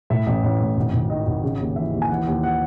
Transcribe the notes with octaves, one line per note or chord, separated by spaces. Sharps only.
A2 E5
A1
A1
A2
G#1
G#1
D#3 D#5
G#1
C#3
D#2
E3 E5
D#2
G#5
E3 F#5
D#2
F#5